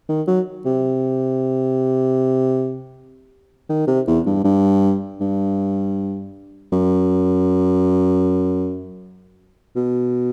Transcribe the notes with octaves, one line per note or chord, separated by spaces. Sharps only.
D#3
F#3
C3
D#3
C3
E2
G2
G2
G2
F#2
B2